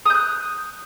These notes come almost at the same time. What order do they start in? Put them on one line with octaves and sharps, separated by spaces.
D#6 G6 F#6